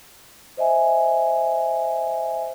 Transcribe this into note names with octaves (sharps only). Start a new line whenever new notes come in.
C5 D#5 E5 G#5